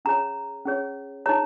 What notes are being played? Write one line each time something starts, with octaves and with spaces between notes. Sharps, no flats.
C#4 G#4 C#5 A#5
C#4 G#4 C#5
D#4 G#4 C#5 A#5